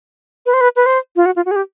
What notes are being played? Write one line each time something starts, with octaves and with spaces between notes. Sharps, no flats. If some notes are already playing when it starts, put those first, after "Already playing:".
B4
C5
B4
B4
C5
F4
F#4
F4
F#4
G#4
G4